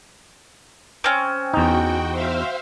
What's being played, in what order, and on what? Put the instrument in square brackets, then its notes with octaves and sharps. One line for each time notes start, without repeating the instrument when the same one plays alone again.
[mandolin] C4 C#4
[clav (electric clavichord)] E2 D#4 [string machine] F#4 G5
[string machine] C5 E5 F5